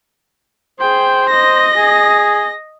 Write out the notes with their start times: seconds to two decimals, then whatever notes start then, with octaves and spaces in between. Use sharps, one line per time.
0.80 G#4 C5 G5
1.30 D#5 A#6
1.77 G#4